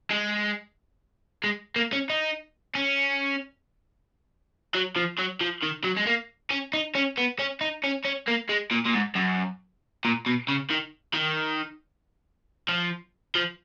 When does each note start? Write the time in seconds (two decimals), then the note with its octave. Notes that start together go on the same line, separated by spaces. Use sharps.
0.11 G#3
1.44 G#3
1.76 A#3
1.93 C#4
2.10 D#4
2.75 C#4
4.75 F#3
4.96 F3
5.19 F#3
5.41 F3
5.62 D#3
5.84 F#3
5.97 G#3
6.07 A#3
6.51 C#4
6.74 D#4
6.95 C#4
7.17 B3
7.39 C#4
7.61 D#4
7.84 C#4
8.05 C#4
8.28 A#3
8.49 G#3
8.71 A#2
8.86 A#2
8.94 G#2
9.16 F#2
10.05 A#2
10.26 B2
10.49 C#3
10.70 D#3
11.14 D#3
12.69 F3
13.35 F3